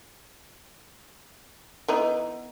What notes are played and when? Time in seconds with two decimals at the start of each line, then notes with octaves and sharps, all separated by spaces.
1.88 E3 B3 D#4